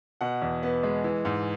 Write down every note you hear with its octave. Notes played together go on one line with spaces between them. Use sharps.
B2 F#5
E2
B3
G#3
E3
G#2